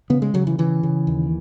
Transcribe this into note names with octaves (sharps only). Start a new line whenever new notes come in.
C#3 B3
G#3
C#3 F#3
E3
C#3 E3
C#3
D#2